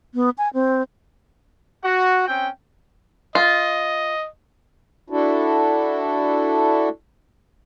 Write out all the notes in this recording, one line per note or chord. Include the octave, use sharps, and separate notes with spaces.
B3
G#5
C4
F#4 F#5
C4 C#4 G5
F4 D#5
D4 E4 F#4 A4